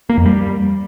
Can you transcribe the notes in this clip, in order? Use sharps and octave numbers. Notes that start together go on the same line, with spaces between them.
A#3
F2
G3